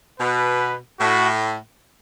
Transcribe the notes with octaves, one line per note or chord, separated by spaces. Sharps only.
B2 B4
A2 F#4